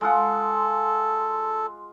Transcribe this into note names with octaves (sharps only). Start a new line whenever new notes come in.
G#3 F4 A4 F#5